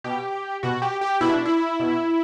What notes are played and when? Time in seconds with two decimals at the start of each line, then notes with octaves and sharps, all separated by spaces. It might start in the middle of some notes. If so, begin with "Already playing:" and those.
0.04 B2 G4
0.63 B2 F#4
0.82 G4
1.01 G4
1.21 B2 E4
1.34 D4
1.45 E4
1.80 B2